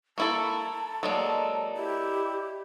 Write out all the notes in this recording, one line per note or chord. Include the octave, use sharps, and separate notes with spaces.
A#3 E4 A4 A5 A#5 C#6 D7
F#3 G#3 A#3 A4 D5 D#5
E4 G4